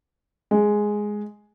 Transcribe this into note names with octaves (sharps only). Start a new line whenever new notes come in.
G#3